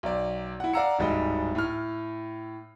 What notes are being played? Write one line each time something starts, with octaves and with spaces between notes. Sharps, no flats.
B1 D5
E4 F#5
D5 F5 F#5 A#5 E6 C#7
D1 G#2 G3 D#5
A2 F6